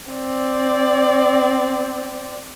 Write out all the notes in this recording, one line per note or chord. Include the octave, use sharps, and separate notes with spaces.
C4 D5